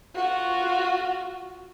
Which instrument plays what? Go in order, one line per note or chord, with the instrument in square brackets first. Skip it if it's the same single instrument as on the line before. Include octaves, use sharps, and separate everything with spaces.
[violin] F4 F#4